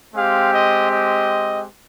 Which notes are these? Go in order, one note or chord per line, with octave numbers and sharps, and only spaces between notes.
G#3 C4 G4 F5
D#5
D#5